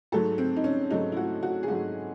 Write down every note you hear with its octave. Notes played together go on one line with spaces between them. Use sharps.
G#2 F#3 A3 A4
C4
D#4
C#4
G#2 F#3 A3 D#4
E4
F#4
F#4
G#4
G#2 F#3 A3 F#4